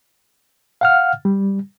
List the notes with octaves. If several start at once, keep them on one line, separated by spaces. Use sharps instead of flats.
F5 F#5 F6
G3